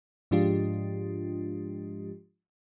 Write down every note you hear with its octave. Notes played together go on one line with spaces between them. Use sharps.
G#2 F3 G#3 D4 F4 G4